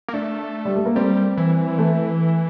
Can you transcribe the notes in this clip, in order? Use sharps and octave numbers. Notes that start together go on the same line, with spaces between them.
A#3
A3 D4
G3
A3
A#3
G3 C4
E3
A3